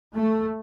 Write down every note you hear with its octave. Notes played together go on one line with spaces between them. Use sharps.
A3